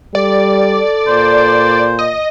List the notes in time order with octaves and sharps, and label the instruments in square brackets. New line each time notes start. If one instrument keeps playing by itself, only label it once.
[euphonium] G3 [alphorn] A4 [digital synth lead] D5
[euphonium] A#2 [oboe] C5
[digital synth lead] D#5